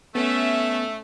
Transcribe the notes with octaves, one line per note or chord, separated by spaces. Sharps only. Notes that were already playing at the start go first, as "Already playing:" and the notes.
A3 B3 C#4 E5